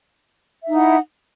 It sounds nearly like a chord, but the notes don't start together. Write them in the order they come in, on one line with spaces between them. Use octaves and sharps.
E5 D#4 E4 F#5